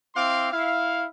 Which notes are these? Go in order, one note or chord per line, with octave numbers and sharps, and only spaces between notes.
C4 E4 F5 C6 D6
E4 F5